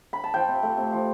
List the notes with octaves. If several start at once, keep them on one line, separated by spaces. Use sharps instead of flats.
B5
A5
F3 G5
C3
A3
C3
F3